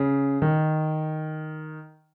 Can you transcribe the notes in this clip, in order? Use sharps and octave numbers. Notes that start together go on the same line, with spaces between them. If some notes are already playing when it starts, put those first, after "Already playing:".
Already playing: C#3
D#3